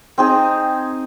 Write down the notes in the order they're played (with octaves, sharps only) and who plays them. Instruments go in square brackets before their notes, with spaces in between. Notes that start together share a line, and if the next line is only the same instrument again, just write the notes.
[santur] C4 D#4 G#4